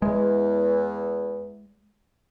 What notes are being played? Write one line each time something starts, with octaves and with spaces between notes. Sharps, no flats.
E2 G#3